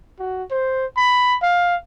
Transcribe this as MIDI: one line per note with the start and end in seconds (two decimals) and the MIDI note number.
0.19 0.43 66
0.51 0.86 72
0.97 1.35 83
1.42 1.76 77